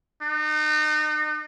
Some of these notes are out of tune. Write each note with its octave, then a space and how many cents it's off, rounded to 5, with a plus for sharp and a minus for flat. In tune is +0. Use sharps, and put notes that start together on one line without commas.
D#4 -35